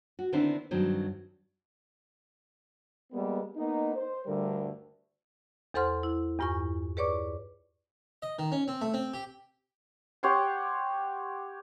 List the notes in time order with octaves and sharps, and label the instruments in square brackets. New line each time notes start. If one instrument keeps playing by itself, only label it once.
[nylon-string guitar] F#4
D3 D#3 B3 C4 D4 E4
G2 D#3 F#3 C4
[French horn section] G3 G#3 A#3 B3
A#3 B3 D#4
C5
D2 G2 D3 G3 A#4
[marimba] E2 A4 C5 F#5 C6 F6
E4
E2 G2 F4 G#5 C#6
G#4 B4 C#5 D5 C#6 D6
[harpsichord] D#5
D#3
C#4
C4
A3
C4
G4
[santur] G4 C#5 F#5 C6